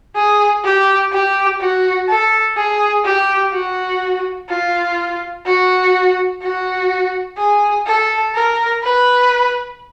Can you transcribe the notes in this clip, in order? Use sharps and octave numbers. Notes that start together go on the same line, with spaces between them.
G#4
G4
G4
F#4
A4
G#4
G4
F#4
F4
F#4
F#4
G#4
A4
A#4
B4